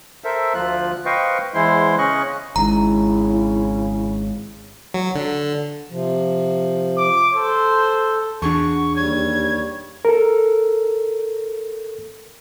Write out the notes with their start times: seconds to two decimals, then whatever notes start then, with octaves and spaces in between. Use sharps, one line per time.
0.24 A4 A#4 C5 E5
0.54 D2 F3 F4 F#6
1.05 B4 C5 D#5 F5 G5 C#6
1.54 E2 E3 G#3 E4 C5 C6
1.98 C#3 C#4 D#5 C#6 F#6
2.56 G#1 G#2 C#3 E4 A#5
4.94 F#3
5.15 D3
5.90 C3 F3
6.97 D6
7.34 A4 C5
8.42 E2 D4 F#4 G#4 A5 C#6
8.96 D#2 G3 C#5 G#6
10.05 A4 A#4